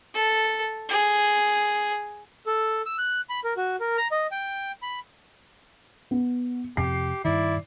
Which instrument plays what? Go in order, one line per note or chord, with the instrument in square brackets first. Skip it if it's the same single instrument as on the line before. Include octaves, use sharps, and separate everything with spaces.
[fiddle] A4
G#4
[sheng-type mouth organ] A4
E6
F#6
B5
A#4
F#4
A#4
A#5
D#5
G5
B5
[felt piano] B3
[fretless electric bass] F2 C3 [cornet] G4 [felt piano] C7
[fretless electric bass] G2 D#3 [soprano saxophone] E4 [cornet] D5